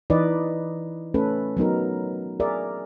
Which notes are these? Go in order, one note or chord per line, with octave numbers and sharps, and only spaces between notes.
E3 D#4 B4 D5 D#5
A3 C#4 A4 B4
F#3 B3 D#4 A#4
G#4 A#4 D5 E5